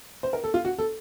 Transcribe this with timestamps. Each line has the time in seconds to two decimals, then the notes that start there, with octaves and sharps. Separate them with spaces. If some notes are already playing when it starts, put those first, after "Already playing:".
0.23 C5
0.33 A#4
0.44 A4
0.54 F4
0.65 F#4
0.79 A4